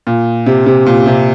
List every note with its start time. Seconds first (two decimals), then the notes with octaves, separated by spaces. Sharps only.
0.07 A#2
0.46 C3
0.66 C3
0.86 A#2
1.06 C3